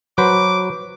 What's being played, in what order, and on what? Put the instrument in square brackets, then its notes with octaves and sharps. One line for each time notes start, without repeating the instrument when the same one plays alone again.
[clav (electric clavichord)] F#3 B4 C5 [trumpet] D6